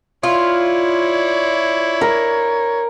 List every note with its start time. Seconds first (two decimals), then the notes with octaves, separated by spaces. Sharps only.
0.23 E4 F4 C#5 D5
2.01 A#4